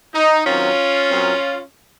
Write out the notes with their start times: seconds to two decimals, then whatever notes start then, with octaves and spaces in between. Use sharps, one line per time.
0.14 D#4
0.46 D#3 F#3 C4 C#4 F4
1.10 A#2 F#3 C4